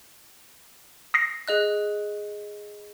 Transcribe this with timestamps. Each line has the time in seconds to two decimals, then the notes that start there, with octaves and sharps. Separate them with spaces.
1.14 D#6 A#6 C7
1.48 G#4 D#5 F#6